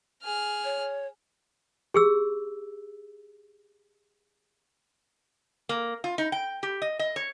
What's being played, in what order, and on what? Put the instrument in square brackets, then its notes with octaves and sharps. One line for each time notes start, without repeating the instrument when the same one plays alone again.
[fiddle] G#4 F6
[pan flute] C#5
[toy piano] G4 G#4 E6
[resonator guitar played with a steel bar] A#3
F4
D#4
G5
G4
D#5
D#5
C#5